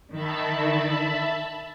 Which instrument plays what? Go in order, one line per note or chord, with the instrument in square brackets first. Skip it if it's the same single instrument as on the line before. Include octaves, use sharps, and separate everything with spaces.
[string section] D#3 [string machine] E5 A5 B5